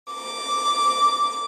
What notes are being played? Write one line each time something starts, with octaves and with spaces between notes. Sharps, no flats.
D6